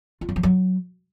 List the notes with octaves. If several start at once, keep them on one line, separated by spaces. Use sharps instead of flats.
F4
F#3
F3
F#3